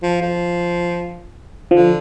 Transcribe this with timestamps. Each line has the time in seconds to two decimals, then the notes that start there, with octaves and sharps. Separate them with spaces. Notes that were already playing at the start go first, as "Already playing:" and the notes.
0.03 F3
0.22 F3
1.71 D3 F3